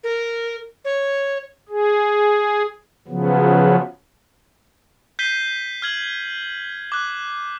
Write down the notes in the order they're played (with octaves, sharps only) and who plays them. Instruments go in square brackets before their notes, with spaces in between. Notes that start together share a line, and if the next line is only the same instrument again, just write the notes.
[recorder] A#4
C#5
[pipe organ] G#4
C#3 F3 F#3 B3
[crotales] G6 B6 C7 D#7 G7
F6 G#6 F#7
D6 F#6